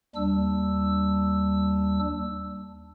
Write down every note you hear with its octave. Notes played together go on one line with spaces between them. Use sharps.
D#2 G3 D4 E6